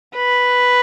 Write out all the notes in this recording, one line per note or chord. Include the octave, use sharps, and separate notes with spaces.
B4